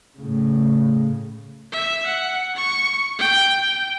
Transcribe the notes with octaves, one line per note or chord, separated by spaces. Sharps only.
A2 C#3
E5
F#5
C#6
G5
G5